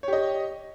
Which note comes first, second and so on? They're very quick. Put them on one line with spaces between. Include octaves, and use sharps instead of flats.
C#5 G4 D#5